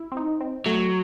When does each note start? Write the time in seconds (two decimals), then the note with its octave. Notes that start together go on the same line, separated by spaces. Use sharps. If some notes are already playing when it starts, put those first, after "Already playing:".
Already playing: E4
0.12 C4
0.17 D#4
0.41 C4
0.66 F#3 A3